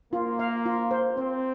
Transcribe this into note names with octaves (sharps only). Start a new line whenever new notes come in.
A#3 F4
F5
F4
C5
C4 C5